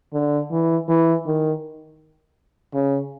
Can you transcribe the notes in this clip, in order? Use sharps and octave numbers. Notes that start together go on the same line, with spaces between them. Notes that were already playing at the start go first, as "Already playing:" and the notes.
D3
E3
E3
D#3
C#3